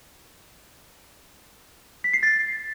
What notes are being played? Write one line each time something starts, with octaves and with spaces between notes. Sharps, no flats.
B6
C7
A6